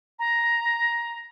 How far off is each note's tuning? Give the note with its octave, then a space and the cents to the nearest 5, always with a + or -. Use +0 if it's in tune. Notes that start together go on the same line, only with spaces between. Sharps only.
A#5 +10